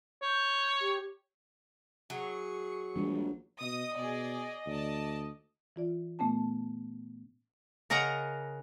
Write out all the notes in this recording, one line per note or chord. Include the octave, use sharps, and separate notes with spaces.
C#5 G6
G4
F#3 G#4 C#6
A#1 E3 G3 G#3
B2 D#5 D#6
B2 G#4 D5
D2 D5 A5
E3 F4 D5
A#2 A3 B3 C#4 A5
C#3 A#4 D#5 F#5 A#5